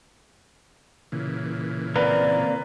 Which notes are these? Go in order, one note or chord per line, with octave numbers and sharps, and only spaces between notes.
A#2 C#3 E3
A#3 C4 A#4 B4 D5